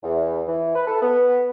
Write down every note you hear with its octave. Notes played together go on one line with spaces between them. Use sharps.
E2
E3
B4
A4
B3